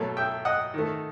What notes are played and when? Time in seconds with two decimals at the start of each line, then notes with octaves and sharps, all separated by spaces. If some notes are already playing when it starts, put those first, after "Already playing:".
Already playing: B2 F#3 A3
0.17 E5 G5
0.45 D#5 F#5
0.74 D#3 A3